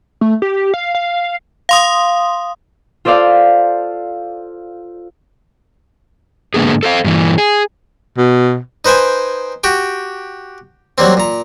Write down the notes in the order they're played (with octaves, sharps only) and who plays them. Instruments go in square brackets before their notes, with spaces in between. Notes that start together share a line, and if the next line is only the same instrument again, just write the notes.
[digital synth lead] A3
G4
F5
F5
[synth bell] F5 C6 D#6
[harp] F4 A4 C5 D5 F5
[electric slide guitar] G#2 D3 A#3 B3 G#4
A4 C5 F5
G2 A#2 D#3 E3
G#4
[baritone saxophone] B2
[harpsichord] D#4 B4 C5 G5 G#5
F#4 G4 G5
F#3 G3 A#3 C4
A#2 A#5